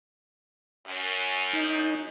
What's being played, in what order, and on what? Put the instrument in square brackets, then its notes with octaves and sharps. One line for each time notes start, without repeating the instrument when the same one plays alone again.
[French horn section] F#2
[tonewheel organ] D#4